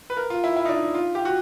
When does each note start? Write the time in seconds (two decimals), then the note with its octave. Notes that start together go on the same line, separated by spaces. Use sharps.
0.10 B4
0.17 A#4
0.30 F4
0.44 E4
0.56 E4
0.65 D#4
0.69 D4
0.94 F4
1.15 G4
1.25 F#4